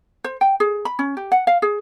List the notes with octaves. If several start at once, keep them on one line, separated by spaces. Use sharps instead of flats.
C5
G5
G#4
B5
C#4
G4
F#5
F5
G#4